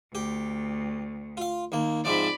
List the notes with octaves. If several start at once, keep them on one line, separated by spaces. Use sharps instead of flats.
D2 G4
F4 F5
D#2 A#3
G#2 C3 F3 D5 B5